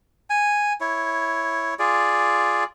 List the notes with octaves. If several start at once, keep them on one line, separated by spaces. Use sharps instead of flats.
G#5
E4 C#5
F4 G#4 D5